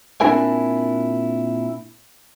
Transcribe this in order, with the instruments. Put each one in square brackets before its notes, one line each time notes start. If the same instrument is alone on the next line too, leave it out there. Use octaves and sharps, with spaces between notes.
[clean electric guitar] A#2 C4 D4 E4 A#4 G#5